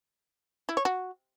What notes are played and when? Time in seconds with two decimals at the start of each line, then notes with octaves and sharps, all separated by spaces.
0.69 E4
0.77 C#5
0.85 F#4